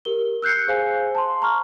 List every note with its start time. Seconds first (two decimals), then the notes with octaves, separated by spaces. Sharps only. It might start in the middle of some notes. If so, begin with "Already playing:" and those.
0.05 G4 A#4 G7
0.42 E6 F#6 G6 C7 C#7
0.68 G#4 C5 F5 G#5
1.15 A5 C6
1.42 A#5 C#6 F6